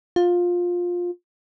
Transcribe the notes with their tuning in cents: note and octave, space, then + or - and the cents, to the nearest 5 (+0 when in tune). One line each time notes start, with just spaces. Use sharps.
F4 +15